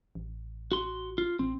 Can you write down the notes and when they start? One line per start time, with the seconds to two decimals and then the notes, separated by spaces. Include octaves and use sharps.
0.15 A1
0.72 F#4 C6
1.18 F4
1.39 A1 C4